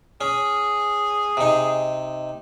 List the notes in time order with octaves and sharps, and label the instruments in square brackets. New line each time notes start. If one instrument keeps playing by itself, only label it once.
[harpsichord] C#4 [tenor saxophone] G#4
[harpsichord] C3 D#4